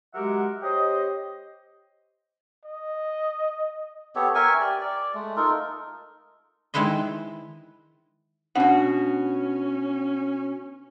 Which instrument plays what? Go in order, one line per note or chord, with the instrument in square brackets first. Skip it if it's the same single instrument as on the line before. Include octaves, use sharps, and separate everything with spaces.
[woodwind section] F#3 G#3 G4 A#4 E5 F#5
G4 C5 C#5 D#5
[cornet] D#5
[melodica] B3 G4 A4 C#5
A#4 E5 G#5 C#6
G4 D5
D5
G#3 A3
D#4 F4 A4 A#4
[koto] D#3 G#3 E4 B4 C5 D#5
[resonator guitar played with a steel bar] B2 F#4 [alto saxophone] C#4 [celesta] D4 [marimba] F#5